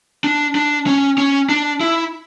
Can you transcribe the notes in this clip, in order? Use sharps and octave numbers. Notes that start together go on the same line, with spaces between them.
D4
D4
C#4
C#4
D4
E4